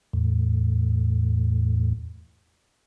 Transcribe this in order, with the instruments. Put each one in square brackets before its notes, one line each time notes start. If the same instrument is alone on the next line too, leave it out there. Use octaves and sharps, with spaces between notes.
[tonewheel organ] E2 A2